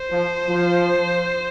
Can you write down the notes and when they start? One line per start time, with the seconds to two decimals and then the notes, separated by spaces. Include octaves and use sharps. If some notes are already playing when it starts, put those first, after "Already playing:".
Already playing: C5
0.11 F3
0.48 F3